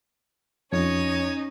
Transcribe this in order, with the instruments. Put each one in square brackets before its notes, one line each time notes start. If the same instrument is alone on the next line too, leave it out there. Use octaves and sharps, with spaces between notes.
[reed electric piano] F2 [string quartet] C#4 D#4 [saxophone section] C#5